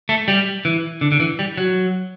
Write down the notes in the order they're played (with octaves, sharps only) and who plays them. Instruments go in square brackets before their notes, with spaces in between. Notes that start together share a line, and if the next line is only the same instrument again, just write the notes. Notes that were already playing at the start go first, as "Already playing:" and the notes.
[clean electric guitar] A3
G3
E3
D3
D3
E3
G3
F#3